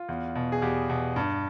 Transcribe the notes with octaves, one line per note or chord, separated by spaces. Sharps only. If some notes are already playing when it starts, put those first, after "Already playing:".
Already playing: F4
E2
B2
G#4
E2 G4
B2
G2